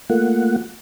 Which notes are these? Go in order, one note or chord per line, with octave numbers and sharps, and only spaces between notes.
A3 A#3 F4 F#5